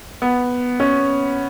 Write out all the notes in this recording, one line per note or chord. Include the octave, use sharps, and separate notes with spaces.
B3
C#4